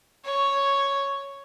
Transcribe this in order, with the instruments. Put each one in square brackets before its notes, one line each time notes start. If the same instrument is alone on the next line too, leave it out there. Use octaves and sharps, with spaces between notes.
[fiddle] C#5